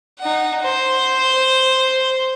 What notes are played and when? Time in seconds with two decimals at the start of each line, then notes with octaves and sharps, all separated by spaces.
0.20 D#4 F#5
0.63 C5